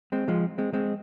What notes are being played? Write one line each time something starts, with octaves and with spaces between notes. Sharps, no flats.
G#3 C4
F3 G#3
G#3 C4
G#3 C4